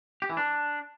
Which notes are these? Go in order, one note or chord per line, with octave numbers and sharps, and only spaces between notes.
G4
E3
D4